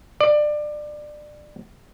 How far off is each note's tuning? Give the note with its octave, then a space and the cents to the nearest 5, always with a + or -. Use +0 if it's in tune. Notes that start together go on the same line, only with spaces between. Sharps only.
D5 +25